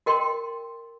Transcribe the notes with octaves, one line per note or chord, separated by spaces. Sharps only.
F#4 A#4 D#5 G5 C6